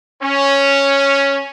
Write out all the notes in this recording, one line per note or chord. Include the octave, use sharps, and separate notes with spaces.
C#4